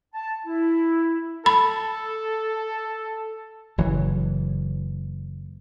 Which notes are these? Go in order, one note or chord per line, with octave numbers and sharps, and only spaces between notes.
A5
E4
A4 B5
F#1 E3 F#3